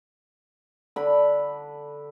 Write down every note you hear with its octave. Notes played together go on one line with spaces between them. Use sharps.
D3 B5